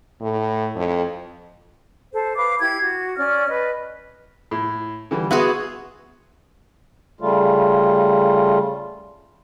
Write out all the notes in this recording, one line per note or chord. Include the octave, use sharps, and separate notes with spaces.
A2
F2
A4 C5
B4 F5 D6
E4 G4 G#6
F#4
C#4 D5 F6
B4 D#5
A2
D3 E3 G3
B3 F#4 G#4 E5 F#5 C6
C#3 G3 A3 F4